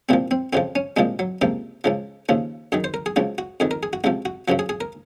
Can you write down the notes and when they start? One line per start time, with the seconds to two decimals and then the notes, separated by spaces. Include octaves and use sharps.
0.09 C2 A#2 F3 C4
0.31 C4
0.53 F2 C#3 F3 C4
0.75 C#4
0.97 C2 A#2 F3 G#3
1.19 F#3
1.41 C#2 C3 F3 A#3
1.84 C#2 C#3 F3
2.29 D#2 C#3 F3
2.72 F#2 D#3 G#4
2.84 C5
2.94 A#4
3.06 G#4
3.16 C#2 C#3 F3 F#4
3.38 F#4
3.60 F2 D#3 G#4
3.71 A#4
3.83 G#4
3.93 F#4
4.04 C#2 C3 F3 F#4
4.25 F#4
4.48 F#2 C#3 F3 F#4
4.59 G#4
4.69 G#4
4.81 A#4